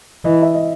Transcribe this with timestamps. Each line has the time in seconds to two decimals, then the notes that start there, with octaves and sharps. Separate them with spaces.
0.24 E3 D#5
0.42 E5
0.54 D#5